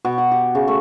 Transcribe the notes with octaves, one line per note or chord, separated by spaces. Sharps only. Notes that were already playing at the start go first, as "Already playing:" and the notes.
B2
F#5
G4
C#3
A3